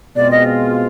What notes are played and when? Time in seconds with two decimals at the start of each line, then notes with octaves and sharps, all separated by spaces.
0.16 B2 G#3 C4 F4 D5
0.31 D#5